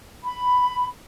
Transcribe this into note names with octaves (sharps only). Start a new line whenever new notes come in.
B5